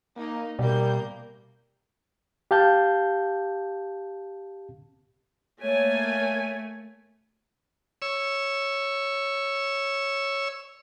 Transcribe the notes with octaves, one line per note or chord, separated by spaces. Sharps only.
A#3 D#4
B2 G3 A#3 A#4 G6
G4 F5 A5 G6
A3 A#3 C#5 G#5
C#5 E6